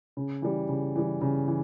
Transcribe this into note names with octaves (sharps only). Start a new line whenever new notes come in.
C#3
E3 G3
C#3
E3 G3
C#3
E3